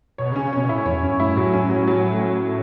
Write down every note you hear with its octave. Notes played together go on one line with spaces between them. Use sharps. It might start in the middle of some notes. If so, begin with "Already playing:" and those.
B2 C#5
C#3
C#4
C#3
B2 C#5
A2 E4
E2 C#5
F#2 C#4
A2 E4
F#2
A2 F#3
C#4
F#3
F#3